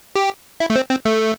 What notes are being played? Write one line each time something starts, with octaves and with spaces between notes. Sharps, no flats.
G4
E4
A3
C4
C4
A3